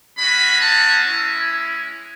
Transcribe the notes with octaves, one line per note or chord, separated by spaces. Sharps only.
G#3 C#4 F#4 B5
A5
G#3 C#4 E4